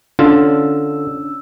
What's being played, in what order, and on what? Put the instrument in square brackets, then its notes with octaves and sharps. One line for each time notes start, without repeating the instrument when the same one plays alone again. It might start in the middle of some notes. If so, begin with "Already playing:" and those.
[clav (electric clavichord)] D3 F4 [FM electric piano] C#4 D4 E6